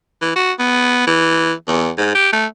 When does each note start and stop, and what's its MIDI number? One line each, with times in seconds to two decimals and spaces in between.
0.22 0.31 52
0.36 0.53 66
0.59 1.02 59
1.07 1.53 52
1.68 1.90 40
1.98 2.11 44
2.15 2.28 67
2.33 2.46 57